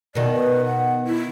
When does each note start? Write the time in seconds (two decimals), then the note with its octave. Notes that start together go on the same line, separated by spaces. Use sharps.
0.15 B2 D#3 D5
0.33 B4
0.66 F#5
1.07 E4